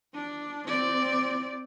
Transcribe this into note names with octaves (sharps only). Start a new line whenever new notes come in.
D4
C4 D5